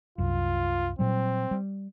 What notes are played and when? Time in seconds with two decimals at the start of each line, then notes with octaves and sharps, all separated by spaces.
0.18 C2 F#2 F4
0.99 A#2 F#3 G3 C4
1.51 G3